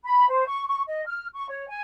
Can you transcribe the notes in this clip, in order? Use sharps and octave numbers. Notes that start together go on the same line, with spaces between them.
B5
C5
C#6
C#6
D#5
F6
C#6
C#5
G#5